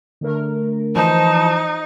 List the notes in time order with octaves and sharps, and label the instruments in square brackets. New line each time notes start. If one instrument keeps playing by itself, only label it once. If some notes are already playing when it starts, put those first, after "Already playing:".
[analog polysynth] D3 A3 A#4
[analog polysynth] E3 F3 C5 [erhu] D#4 [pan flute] A5